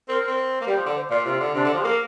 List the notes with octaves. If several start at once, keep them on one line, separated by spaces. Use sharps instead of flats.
C4 A#4
C4
A#3
G3 G4
F3
D3
C5
A#2 D5
C3 F4
D3
C3 D4
D3
F3 G4
A#3 A#4